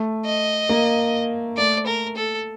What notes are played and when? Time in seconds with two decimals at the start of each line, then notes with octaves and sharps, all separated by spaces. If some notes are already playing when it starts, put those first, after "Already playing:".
Already playing: A3
0.26 D#5
0.69 A#3
1.57 A3 D5
1.86 A#4
2.16 A4